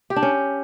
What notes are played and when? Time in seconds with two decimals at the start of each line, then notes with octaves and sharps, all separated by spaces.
0.10 G4
0.16 D4
0.23 C#4